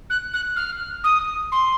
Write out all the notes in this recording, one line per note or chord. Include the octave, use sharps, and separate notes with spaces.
F#6
F#6
F6
D#6
C6